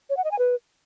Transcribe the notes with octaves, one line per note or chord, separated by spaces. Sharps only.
C#5
F#5
D#5
G#5
B4